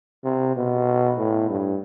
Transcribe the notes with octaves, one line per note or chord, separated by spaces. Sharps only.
C3
B2
A2
G2